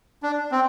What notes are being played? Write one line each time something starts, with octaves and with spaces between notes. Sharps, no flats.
D4
C4